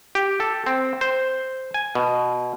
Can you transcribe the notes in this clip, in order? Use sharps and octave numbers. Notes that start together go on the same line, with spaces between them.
G4
A4
C4
C5
G#5
B2